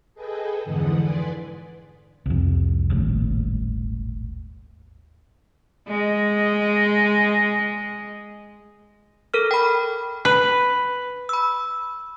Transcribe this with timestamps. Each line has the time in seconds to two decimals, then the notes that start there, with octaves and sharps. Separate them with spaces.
0.14 G#4 A4 B4 D#5 G5 G#5
0.64 F2 G#2 D3 E3 F#5 D#6
0.96 B4 D5 G#5 C6
2.26 C2 F2
2.90 D#1 G#1 A2
5.88 G#3 D#5
9.34 A4 A#4 F6
9.51 G5 B5
10.25 B4
11.29 B5 E6